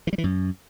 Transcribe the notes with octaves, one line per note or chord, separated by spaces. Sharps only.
E3
G3
E3
F#2